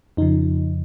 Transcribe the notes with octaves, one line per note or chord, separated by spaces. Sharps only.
F2 C#3 F3 D#4